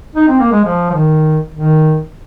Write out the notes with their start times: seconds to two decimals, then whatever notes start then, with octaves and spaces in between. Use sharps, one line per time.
0.15 D#4
0.28 C4
0.40 A#3
0.52 G#3
0.64 F3
0.90 F3
0.94 D#3
1.54 D#3